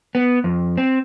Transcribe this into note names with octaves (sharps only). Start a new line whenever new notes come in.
B3
F2
C4